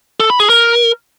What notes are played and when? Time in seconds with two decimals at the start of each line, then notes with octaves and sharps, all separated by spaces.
0.20 A4
0.30 B5
0.40 G#4
0.49 A#4